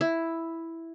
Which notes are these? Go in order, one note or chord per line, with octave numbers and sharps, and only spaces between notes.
E4